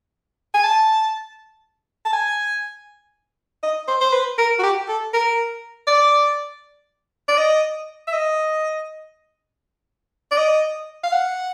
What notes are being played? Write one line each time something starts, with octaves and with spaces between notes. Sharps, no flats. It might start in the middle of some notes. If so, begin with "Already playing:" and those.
G#5
A5
A5
G#5
D#5
C5
C5
B4
A#4
F#4
G4
A4
A#4
D5
D5
D#5
E5
D#5
D5
D#5
F5
F#5